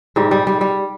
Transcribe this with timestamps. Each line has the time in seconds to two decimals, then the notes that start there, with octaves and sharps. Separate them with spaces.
0.16 G#2 G3
0.31 G3
0.47 G3
0.61 G3